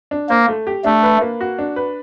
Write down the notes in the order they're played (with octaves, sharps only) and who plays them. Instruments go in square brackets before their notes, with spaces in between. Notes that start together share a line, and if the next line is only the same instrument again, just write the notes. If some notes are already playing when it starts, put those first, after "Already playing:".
[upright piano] D4
[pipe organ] A#3 [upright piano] C5
[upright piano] A3
G4
[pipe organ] A3 [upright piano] D4
[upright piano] B4
A#3
F#4
D4
B4